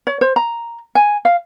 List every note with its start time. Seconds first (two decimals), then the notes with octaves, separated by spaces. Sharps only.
0.07 C#5
0.21 C5
0.36 A#5
0.95 G#5
1.25 F5